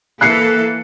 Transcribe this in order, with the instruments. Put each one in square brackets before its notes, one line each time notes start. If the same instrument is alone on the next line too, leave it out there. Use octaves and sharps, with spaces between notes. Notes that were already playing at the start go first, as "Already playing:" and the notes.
[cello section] E3 A#3 A4 [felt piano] F#6 C7 C#7